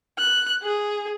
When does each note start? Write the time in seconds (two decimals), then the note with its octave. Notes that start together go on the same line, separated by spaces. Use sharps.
0.18 F#6
0.63 G#4